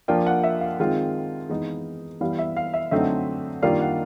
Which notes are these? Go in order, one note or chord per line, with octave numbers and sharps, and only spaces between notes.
F3 A#3 D4 F4 G5
F#5
E5
F5
D#3 G#3 C4 F4
E3 G#3 B3 D#4
E3 G3 B3 E4 F5
E5
F5
E5
D3 F#3 A3 C4 D#4 E5
D#3 G3 A#3 D4 F4 F5
F#5